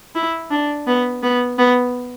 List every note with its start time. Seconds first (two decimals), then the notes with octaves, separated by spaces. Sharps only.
0.15 E4
0.51 D4
0.87 B3
1.23 B3
1.58 B3